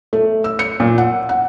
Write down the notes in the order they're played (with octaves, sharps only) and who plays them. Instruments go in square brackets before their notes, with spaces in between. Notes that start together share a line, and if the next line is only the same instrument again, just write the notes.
[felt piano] A3
E6
C#7
A#2
F#5
F#5